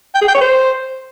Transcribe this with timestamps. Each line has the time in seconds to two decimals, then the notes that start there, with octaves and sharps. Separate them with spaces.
0.15 G5
0.21 G#4
0.28 G5
0.35 C#5
0.41 C5